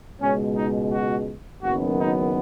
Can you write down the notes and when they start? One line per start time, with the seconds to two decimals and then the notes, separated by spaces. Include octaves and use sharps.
0.19 C#2 B2 G#3 C#4
0.56 D#4
0.92 F#4
1.63 F#1 F#2 D#3 B3 F#4
1.99 D#4